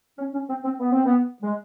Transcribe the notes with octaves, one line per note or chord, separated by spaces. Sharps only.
C#4
C#4
C4
C4
B3
C4
B3
G#3